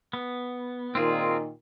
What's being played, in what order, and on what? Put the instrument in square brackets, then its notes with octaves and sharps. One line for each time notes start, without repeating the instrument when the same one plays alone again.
[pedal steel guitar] B3
[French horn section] A#2 D#3 [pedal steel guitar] C4 F4 G#4